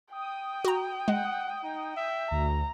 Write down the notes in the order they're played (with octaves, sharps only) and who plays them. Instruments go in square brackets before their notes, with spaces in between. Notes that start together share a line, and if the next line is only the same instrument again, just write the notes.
[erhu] G5 [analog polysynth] D#6
[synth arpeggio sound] F#4 A#5
[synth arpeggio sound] G#3 [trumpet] F#5
[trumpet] D#4
E5
[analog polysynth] D2 [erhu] A#5